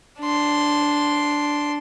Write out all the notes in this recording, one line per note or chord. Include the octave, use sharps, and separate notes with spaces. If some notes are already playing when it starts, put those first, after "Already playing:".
D4 C6